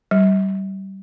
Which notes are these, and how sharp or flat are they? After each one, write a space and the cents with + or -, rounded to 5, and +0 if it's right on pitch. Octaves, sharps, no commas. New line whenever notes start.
G3 -25